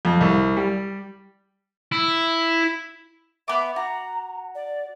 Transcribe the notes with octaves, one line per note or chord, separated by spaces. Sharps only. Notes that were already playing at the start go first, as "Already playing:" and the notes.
F2
C2
G3
E4
B3 E5 D6
F#4 A#5
D5